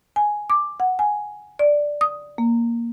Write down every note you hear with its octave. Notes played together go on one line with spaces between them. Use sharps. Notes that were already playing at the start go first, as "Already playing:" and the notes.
G#5
D6
F#5
G#5
D5
D#6
A#3